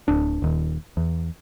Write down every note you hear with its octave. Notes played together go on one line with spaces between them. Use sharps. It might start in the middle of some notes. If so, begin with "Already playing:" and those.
D1 D4
D#1 D#2
E2